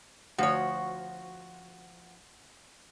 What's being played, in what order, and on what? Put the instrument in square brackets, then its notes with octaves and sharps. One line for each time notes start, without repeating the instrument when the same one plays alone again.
[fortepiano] D2 [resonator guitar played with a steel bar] F3 C#5 [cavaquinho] F#4